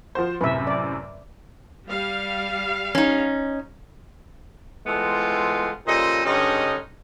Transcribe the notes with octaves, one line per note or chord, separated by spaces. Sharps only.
F3 F#4 C5
F#2 A2 C3 B4 E5
D5
G3 F5
C#4 D#4
E3 G#3 A3 B3 C4 F4
A#2 C#3 G3 A4 C5 D#5
G2 D3 G#3 C#4 D#4 D#5